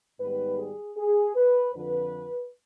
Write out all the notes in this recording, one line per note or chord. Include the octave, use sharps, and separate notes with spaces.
G#2 D#3 G3 B3 B4
G#4
G#4
B4
F2 D3 F3 B4